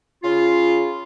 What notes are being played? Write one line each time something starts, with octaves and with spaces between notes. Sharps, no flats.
C#3 F4